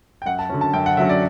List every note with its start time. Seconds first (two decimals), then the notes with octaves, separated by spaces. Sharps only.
0.22 G5
0.26 F#2 F#5
0.39 A5
0.49 D3 F#3 C#4
0.61 A5
0.74 F#2 G5
0.86 F#5
0.97 D3 F#3 C#4 E5
1.09 D5